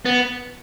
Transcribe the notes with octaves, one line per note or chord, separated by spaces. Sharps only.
B3